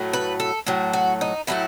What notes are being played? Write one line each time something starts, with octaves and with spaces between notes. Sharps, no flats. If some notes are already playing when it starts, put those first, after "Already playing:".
Already playing: A2 F#3 A3
B4
A4
A2 F#3 A3
F#4
D#4
A2 F#3 A3 E4